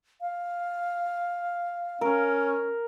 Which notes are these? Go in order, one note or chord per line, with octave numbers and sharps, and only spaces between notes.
F5
C#4 A#4